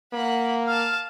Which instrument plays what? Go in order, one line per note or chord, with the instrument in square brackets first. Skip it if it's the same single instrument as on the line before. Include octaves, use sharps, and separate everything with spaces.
[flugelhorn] A#3 [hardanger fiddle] F#5 B5
[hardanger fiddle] F5 A5 [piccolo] F6